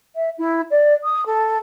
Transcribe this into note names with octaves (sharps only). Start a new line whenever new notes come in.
E5
E4
D5
D#6
A4